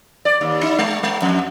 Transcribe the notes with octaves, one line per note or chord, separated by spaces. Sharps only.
D5
D#2
D#4
G#3
G#3
F2